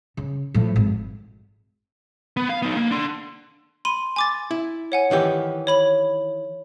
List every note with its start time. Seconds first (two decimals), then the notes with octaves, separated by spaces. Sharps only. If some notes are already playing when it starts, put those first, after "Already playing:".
0.17 C#3
0.54 A2 F3
0.76 G#1
2.37 B3
2.49 F5
2.62 B3 D#4
2.76 A#3
2.91 D4 C6
3.85 B5 C6 D#7
4.16 G#5 D6 A6
4.51 E4
4.92 C#5 F#5 G#5
5.11 D#3 E3 G4
5.67 C#5 B5 F#7